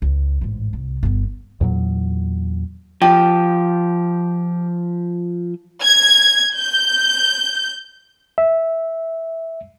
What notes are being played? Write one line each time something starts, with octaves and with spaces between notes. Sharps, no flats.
C#2
A1 G#2
C2
G1 B3
E2 A#2 F#3
F3 G4
G#6
G6
E5